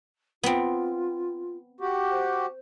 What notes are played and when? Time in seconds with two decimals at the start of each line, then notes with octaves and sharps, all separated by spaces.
0.43 B3 C4 F4
1.81 F#4 G4
2.11 C5